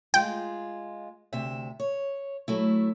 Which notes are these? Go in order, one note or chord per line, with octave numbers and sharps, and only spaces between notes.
G#3 F4 G5
D2 C3 E5
C#5
F#3 A3 E4